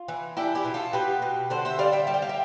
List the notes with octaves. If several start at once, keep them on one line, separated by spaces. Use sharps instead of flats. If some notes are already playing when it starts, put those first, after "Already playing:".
Already playing: F4
E3
D4 E4 G4
E4 G4
B2
F4 A4
B2 G4 B4
B2
D3 A4 C5
C5 E5
G3 D5 F5
E5 G5
G3 A5
G5
F5
E5 G5